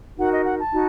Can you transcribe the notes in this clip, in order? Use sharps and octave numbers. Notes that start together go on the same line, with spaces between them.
D#4 F#4 A#4 F#5
D#5
F#5
A5
D#4 F#4